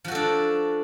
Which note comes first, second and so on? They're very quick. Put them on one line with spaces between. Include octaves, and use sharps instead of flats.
F3 F#4 A4 D4